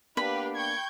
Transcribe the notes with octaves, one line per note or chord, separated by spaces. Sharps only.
A#3 B3 D4 G4 B4 F5 B5
G5 C#6 G6 G#6